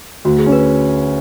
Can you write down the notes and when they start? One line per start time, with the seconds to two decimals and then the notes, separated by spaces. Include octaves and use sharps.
0.25 D2 F#4
0.39 G#4
0.46 C#4
0.52 B4